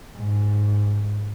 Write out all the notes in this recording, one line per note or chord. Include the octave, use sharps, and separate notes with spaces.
G#2